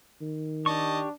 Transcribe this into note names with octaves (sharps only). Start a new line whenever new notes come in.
D#3
D4 G4 D#5 A5 C#6